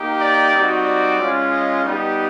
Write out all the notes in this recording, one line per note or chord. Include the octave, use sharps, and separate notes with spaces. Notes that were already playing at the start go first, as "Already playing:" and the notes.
Already playing: A#3 D#4 G4
D5
G3 C4 D#4 F#4
D5
G#3 C#4 F4
D#5
G3 B3 D#4 G4